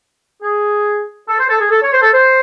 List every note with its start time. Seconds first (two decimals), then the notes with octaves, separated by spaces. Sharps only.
0.42 G#4
1.28 A4
1.38 C5
1.49 A4
1.60 G#4
1.70 A4
1.82 C#5
1.92 C5
2.02 A4
2.13 C5